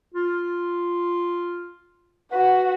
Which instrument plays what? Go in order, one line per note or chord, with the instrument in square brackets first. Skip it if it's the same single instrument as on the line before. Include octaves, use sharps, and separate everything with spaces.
[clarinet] F4
[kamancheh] F#4 F#5 [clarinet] B4